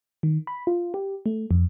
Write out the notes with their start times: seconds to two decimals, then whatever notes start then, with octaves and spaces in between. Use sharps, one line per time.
0.23 D#3
0.47 B5
0.67 F4
0.94 G4
1.26 A3
1.51 F2